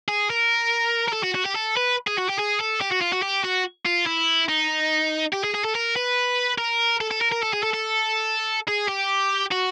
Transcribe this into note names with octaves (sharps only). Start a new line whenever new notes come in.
G#4
A#4
A#4
A4
F#4
F#4
G4
A4
B4
G#4
F#4
G4
G#4
A4
G4
F#4
F4
F#4
G4
F#4
F4
E4
D#4
G4
G#4
G#4
A4
A#4
B4
A#4
A4
A4
A#4
A#4
A4
G#4
A4
A4
G#4
G4
F#4